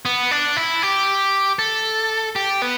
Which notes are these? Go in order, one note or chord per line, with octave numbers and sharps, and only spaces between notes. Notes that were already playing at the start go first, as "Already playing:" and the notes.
B3
D4
E4
G4
A4
G4
B3